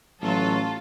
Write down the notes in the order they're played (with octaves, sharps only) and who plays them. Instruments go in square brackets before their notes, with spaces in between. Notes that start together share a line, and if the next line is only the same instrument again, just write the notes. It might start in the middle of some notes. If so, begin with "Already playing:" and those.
[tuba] A1 [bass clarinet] F#3 [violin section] F4 A4